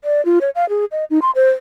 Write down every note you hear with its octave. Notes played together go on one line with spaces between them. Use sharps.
D5
F4
C#5
F5
G#4
D#5
D#4
C6
C5